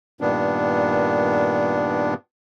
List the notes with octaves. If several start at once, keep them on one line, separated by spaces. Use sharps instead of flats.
G2 A#2 D#3 B3 D4